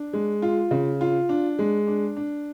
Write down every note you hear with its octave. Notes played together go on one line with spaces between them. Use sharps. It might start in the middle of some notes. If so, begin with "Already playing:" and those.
Already playing: D4
G#3
F4
C#3
F4
D4
G#3
D4
D4